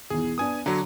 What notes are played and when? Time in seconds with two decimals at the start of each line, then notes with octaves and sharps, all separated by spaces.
0.10 B1 E2 G#4
0.38 B3 D4 G#5 D#6
0.66 D3 F#3 C#5 A#5